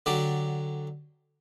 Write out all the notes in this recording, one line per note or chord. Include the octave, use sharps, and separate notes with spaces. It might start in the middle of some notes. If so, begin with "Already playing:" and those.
D3 F#3 G4 D5